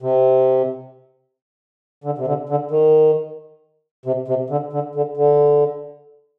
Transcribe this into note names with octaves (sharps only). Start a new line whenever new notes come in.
C3
D3
C3
D3
D3
D#3
C3
C3
D3
D3
D3
D3